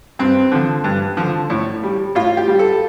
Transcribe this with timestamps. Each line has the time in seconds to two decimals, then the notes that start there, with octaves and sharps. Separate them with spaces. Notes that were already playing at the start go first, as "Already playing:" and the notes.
0.19 G2 C4
0.52 D3 F3
0.84 G2
1.17 D3 F3
1.50 A2
1.83 G3
2.15 A2 F4
2.37 G4
2.48 G3
2.59 A4